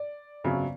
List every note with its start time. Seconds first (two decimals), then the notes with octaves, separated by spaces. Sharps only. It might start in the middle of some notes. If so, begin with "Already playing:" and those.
Already playing: D5
0.44 G1 F2 C#3 F#3